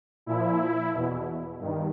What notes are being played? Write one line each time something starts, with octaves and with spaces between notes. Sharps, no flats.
A#2 F3 E4
E2 B2
G2 D#3